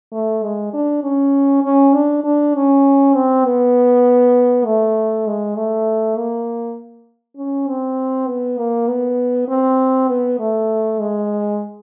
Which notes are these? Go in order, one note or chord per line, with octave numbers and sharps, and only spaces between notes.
A3
G#3
D4
C#4
C#4
D4
D4
C#4
C4
B3
A3
G#3
A3
A#3
C#4
C4
B3
A#3
B3
C4
B3
A3
G#3